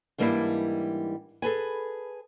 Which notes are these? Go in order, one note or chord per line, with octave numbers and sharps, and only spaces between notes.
G#2 E3 G3 A#3 D4 E4
G#4 A4 B4 G#5